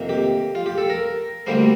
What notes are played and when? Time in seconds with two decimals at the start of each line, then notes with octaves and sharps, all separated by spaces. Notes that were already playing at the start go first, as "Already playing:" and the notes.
Already playing: F2 C3 D#3 A#3
0.09 G4
0.55 F4
0.66 G4
0.78 A4
0.90 A#4
1.46 D2 D3 G3 A#3 C5